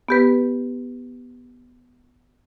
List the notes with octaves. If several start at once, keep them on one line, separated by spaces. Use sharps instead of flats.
B3 G4 B4